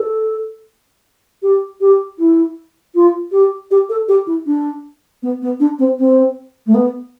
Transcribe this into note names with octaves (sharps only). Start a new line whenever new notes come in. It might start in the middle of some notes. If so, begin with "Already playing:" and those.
Already playing: A4
G4
G4
E4
F4
G4
G4
A4
G4
E4
D4
B3
B3
D4
C4
C4
A3
B3